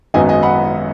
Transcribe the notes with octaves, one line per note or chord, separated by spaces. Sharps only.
G#1 F#2 F#3 B3 D#5 G#5
D#5 G#5
F#5 B5